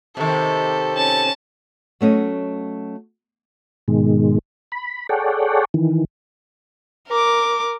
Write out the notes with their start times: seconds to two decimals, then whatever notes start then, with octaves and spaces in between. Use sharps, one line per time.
0.17 C3 D#3 G4 A4
0.95 C#4 A5
2.01 F#3 A3 C#4 D#5
3.88 G#2 B2 D#3 G#3
4.72 B5
5.09 G#4 A4 C#5 D5 F#5 G5
5.74 D#3 E3
7.08 A#4 D6